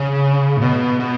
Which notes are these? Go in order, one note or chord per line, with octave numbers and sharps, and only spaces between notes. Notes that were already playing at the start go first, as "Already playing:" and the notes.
Already playing: C#3
A2
B2
B2